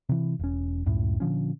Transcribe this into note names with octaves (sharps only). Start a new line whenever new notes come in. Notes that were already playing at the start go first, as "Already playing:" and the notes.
C3 E3
E1 C#4
C#2 F#2 A2
A#2 D3 F3 C#4